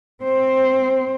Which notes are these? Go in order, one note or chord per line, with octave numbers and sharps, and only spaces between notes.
C4 C5